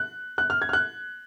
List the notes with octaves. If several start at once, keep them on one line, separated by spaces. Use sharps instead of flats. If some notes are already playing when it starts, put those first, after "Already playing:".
Already playing: F#6
F#6
F6
G#6
F6
F#6